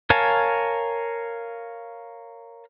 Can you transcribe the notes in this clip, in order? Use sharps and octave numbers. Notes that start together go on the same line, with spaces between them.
A#4 C#5 F5 G#5 A5